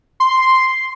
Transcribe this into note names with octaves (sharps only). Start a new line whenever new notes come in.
C6